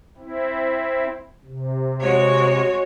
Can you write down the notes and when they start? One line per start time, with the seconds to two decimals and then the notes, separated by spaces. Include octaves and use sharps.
0.18 C4 E4
1.44 C3
2.01 G#3 F#4 C#5